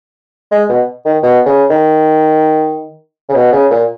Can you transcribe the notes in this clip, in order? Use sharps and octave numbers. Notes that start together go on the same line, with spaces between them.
G#3
B2
D#3
B2
C#3
D#3
C#3
B2
C#3
A#2